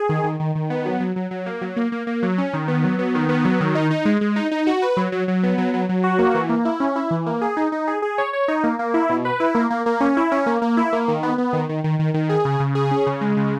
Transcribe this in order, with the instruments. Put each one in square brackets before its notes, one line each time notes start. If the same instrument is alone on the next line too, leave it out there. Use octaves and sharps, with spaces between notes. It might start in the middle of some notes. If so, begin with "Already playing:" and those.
Already playing: [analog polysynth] G#4
D#3
D#3
D#3
D#3
B3
F#3
F#3
F#3
F#3
A#3
F#3
A#3
A#3
A#3
F#3
C#4
D#3
B3
F#3
B3
D#3
B3
F#3
D#3
D#4
D#4
G#3
G#3
D#4
D#4
F#4
B4
F#3
F#3
F#3
B3
F#3
F#3
F#3
F#4
A#3
E3
A#3
E4
C#4
E4
E3
A#3
G#4
D#4
D#4
G#4
G#4
C#5
C#5
D#4
A#3
A#3
E4
B2
B4
E4
A#3
A#3
A#3
C#4
E4
C#4
A#3
A#3
E4
A#3
D#3
B3
B3
D#3
D#3
D#3
D#3
D#3
G#4
C#3
C#3
G#4
C#4
C#3
G#3
C#3